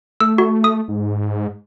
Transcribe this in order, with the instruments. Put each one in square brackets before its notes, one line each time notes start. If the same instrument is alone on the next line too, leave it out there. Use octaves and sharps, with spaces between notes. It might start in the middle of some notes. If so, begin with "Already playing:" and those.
[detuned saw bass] A3 [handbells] E6
[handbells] F#4
D#6
[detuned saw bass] G#2